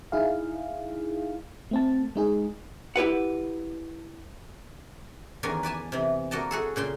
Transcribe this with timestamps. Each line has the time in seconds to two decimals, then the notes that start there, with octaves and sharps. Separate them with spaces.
0.12 D#4 E4 G#4 F5
1.71 A3 C4 A5
2.16 G#3 D#4 G#4
2.96 E4 G4 B4 F#5
5.43 E2 D#3 C#4 D5 G#5 A#5
5.63 B4 D5 G#5 A5
5.92 C3 E3
6.31 A#3 F#4 D5 D#5 A5
6.51 F#4 G#4 A4
6.76 A#2 C#3 G5 C6